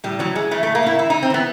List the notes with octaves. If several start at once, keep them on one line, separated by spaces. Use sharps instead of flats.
A2 G3
E3 F#3
E3 G#3
E3 A3
A2 A3
A#3
A2 E4
E3 E4
E3 D#4
C4
E3 B3